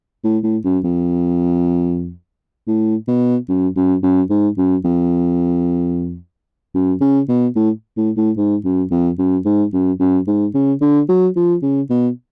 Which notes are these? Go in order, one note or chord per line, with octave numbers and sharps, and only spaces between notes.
A2
A2
F#2
F2
A2
B2
F#2
F#2
F#2
G#2
F#2
F2
F#2
C#3
B2
A2
A2
A2
G#2
F#2
F2
F#2
G#2
F#2
F#2
G#2
C#3
D3
F#3
F3
C#3
B2